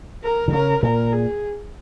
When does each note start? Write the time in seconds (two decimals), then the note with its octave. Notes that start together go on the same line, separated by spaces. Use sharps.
0.24 A#4
0.48 D#3
0.53 C#3 A#4
0.83 A#2 A#4
1.13 G#4